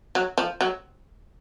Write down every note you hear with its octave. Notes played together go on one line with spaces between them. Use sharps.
F#3
F3
F#3